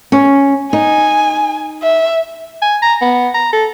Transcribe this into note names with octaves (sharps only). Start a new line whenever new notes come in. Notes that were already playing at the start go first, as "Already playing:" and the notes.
C#4
D#4 G#5
E5
G#5
A#5
B3
A#5
A4